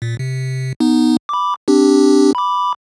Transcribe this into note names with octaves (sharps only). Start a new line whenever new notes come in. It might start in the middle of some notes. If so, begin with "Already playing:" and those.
A#2
C3
B3 D#4
B5 D6
C4 D4 G4
B5 D6